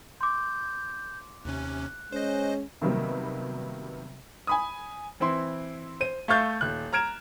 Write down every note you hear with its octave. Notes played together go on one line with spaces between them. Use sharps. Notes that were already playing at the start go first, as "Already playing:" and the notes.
C6 D6 G6
D#2 C3 C#4 F#6
G#3 C#4 C5 D#5
C3 D#3 F#3 G3 A#3 B3
G#5 B5 D#6
E3 C4 E4 C6
C5 D#7
A3 E5 F5 C#6 G6 A6
D#1 F#6
A#5 F6 G#6 D7 E7